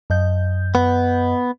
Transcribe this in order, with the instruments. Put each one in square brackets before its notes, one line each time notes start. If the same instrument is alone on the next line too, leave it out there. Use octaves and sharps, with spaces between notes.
[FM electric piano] F#2 D#5 G6
[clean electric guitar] B3